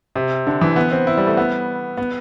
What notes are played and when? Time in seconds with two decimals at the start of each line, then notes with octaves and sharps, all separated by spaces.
0.16 C3
0.47 D3
0.61 E3
0.76 B3
0.92 C4
1.07 E4
1.17 G3
1.27 A3
1.37 B3
1.97 B3